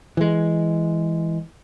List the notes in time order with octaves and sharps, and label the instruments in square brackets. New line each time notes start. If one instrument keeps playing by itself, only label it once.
[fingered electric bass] E3 G#3